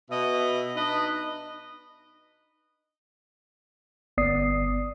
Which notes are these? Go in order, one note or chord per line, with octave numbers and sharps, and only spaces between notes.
B2 D#5 E5
D4 D#4 B4 D#5
G1 B3 D5 D#6 C7